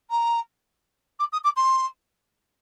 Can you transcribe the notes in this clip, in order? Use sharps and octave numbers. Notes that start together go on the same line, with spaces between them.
A#5
D6
D#6
D6
C6